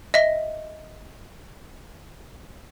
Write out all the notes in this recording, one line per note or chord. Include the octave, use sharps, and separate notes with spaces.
D#5 E5 A#6